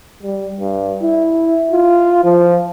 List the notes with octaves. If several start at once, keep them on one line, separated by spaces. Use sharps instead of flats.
G3
G2
E4
F4
F3